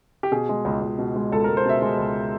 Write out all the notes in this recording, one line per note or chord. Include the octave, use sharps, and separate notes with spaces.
G4
B2 G#4
G#3
C#2
C#2
B2
G#3
C#2 A4
A#4
C#2
C5
B2 E5
G#3
C#2